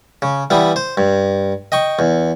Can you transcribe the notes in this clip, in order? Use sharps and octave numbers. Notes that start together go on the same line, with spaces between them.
C#3
E3 G3 B3
C5
G2
D#5 G5 C#6
E2